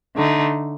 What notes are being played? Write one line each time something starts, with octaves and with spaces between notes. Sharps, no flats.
D3 A3 D#4